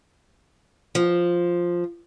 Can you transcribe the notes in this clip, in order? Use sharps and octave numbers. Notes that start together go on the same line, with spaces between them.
F3